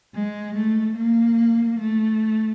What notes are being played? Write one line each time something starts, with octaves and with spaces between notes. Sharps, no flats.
G#3
A3
A#3
A3